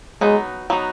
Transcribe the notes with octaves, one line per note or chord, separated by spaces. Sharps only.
F#3 G#3 B3 D#4
F#3 B3 D#4